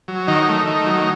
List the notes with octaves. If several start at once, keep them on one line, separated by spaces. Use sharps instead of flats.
F#3
D#3 D#4
A3
D#3
F#3